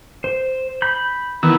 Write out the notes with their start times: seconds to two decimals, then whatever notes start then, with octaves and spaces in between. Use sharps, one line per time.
0.24 C5
0.82 B5 G6
1.43 D#3 E3 B3 E6